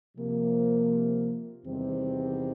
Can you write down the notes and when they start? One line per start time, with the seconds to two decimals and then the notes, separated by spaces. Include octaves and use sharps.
0.17 C3 F3 A#3
1.64 E2 C3 D#3 G3 C4